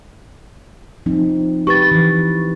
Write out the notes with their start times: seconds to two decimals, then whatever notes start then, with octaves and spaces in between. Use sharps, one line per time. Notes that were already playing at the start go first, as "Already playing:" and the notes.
1.06 F3 C4 D#4
1.67 G4 B4 C#6 A6
1.92 E3